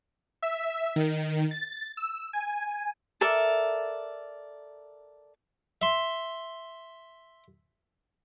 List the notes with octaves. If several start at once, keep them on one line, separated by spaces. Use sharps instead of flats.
E5
D#3
A6
E6
G#5
A4 A#4 D5 E5
E5 C6